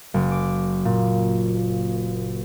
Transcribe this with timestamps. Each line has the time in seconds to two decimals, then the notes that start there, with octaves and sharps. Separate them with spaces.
0.14 F#1
0.31 D6
0.85 A#2